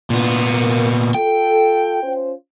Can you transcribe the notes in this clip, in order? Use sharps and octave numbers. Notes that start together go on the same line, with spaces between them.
A#2 B3 D4 E4 F4
A#3
F4 A4 G5
C#4 F4 C5